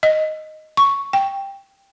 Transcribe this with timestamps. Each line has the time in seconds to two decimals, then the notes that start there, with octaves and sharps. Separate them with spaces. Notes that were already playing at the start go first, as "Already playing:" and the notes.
0.03 D#5
0.77 C#6
1.13 G5